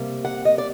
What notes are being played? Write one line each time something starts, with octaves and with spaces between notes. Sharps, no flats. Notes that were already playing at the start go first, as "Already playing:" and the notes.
Already playing: C3 G3 A#3
F#5
D#5
D5